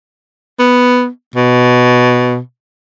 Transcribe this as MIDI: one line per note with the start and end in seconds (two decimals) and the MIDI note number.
0.59 1.08 59
1.36 2.39 47